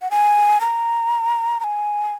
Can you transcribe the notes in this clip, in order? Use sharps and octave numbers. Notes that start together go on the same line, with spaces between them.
F#5
G#5
A#5
A#5
G#5